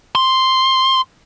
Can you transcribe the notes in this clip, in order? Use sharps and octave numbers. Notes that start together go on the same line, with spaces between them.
C6